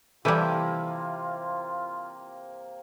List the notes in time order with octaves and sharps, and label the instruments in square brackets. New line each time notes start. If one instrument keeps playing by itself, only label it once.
[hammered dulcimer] C3 A#3 [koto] E3 G3 [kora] E4 G4 A4 [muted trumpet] F4